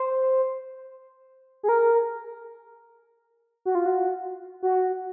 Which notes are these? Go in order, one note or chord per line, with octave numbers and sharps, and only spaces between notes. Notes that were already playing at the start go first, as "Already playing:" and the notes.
Already playing: C5
G#4
A#4
F#4
F4
F#4
F#4